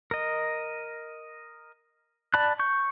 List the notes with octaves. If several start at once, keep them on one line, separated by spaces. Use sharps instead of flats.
A#4 D#5
D5 A5 B5 F#6
C#6 G6